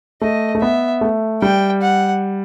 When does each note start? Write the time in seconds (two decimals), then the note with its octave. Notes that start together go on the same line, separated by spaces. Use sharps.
0.21 A3 D#5
0.55 A3
0.62 B3 E5
1.01 A3
1.42 G3 G5
1.82 F#5